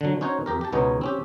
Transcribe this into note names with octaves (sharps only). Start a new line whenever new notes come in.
D3 F#3
C#4 D#4 F#4 C5 C#5
F2 G4 A#4
G4 A5
C#2 B2 B3 D#4 G#4 C#5
C4 C#4 G4